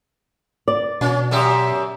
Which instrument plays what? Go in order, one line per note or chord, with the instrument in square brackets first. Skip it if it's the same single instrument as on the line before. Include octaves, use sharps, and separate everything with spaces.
[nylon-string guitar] D5
[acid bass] B2 [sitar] C#4
[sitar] F#2 G4 E5